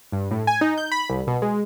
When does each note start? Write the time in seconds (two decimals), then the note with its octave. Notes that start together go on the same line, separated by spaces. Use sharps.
0.12 G2
0.31 A2
0.47 G#5
0.61 D#4
0.78 G6
0.92 B5
1.10 C2
1.27 B2
1.42 G#3